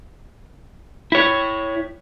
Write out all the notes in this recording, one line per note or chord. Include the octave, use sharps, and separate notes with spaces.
E4 C#5